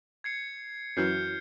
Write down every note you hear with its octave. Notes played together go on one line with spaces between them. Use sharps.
G#6 C7 C#7
F#2 E3 F#3 F6 G6 C7